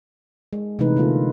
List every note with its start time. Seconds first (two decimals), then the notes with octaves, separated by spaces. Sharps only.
0.53 G#3
0.79 C3 E3 G#3 A3 D#4 B4
0.97 D3 A#3 F4 A4